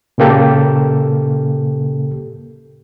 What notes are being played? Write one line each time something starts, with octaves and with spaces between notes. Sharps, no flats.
A#2 C#3 A#3 G4 A4